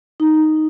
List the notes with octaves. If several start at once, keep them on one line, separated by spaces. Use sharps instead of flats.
D#4